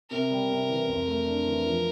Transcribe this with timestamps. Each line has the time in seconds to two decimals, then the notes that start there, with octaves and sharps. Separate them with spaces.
0.10 C3 A#4
0.30 G3
0.50 C3
0.69 E3
0.88 F2
1.07 A3
1.27 D4
1.47 E3
1.66 F3